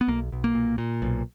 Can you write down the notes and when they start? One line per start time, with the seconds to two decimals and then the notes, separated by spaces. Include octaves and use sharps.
0.01 B3
0.08 B1 A#3
0.32 B1
0.44 A#3
0.55 A#2
0.78 A#2
1.02 B1